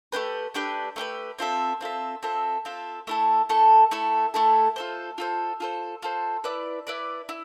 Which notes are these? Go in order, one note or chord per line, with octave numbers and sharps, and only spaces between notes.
A3 D4 G4 B4
A3 D4 G4 B4
A3 D4 G4 B4
C4 F4 A4 E5
C4 F4 A4 E5
C4 F4 A4 E5
C4 F4 A4 E5
A3 E4 A4
A3 E4 A4
A3 E4 A4
A3 E4 A4
F4 A4 C5
F4 A4 C5
F4 A4 C5
F4 A4 C5
E4 B4 D5
E4 B4 D5
E4